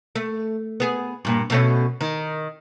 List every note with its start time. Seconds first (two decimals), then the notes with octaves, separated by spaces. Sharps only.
0.15 A3
0.80 B3 G#4
1.25 G2 A#2
1.50 B2 A3 C#4
2.01 D#3